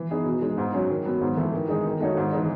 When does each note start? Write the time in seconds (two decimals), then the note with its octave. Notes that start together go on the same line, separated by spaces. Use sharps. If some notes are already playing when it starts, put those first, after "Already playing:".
Already playing: E3
0.11 B3 D#4 G#4
0.26 B2
0.42 G#3 D#4
0.58 G#2
0.74 F#3 C#4
0.90 D#3
1.05 F#3 B3
1.21 G#2
1.37 E3 A3 E4
1.54 D#3
1.68 G#3 D#4 G#4
1.85 D#3
2.01 A3 D#4 F#4 C#5
2.17 G#2
2.32 E3 G#3 D#4